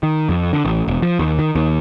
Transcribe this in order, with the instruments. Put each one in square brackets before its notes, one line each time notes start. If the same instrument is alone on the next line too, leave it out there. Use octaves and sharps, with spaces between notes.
[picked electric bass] D#3
F2
D3
A1
E1
F3
D#2
D#3
D#2